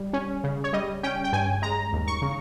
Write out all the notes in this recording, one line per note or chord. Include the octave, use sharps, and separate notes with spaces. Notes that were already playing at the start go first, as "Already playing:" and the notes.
Already playing: G3
C#4
C#3
C#5
G3 D#5
C#4 G5
G5
G2 G#5
G#3 A#5
D#2
C#6
C#3